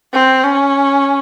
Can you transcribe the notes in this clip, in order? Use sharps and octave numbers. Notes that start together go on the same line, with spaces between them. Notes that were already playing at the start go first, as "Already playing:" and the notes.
C4
C#4